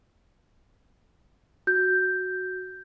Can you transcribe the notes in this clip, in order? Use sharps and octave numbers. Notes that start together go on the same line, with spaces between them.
F#4 G6